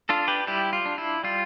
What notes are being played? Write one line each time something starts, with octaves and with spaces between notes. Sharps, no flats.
D4 F4 A4
G4 B4
G3 E4 G4
F4
D4
E4
G3 F4